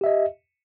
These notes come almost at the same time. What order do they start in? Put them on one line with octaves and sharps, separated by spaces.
G4 E5 D#5